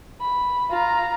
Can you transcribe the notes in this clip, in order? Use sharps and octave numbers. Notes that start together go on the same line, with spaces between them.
B5
F4 A#5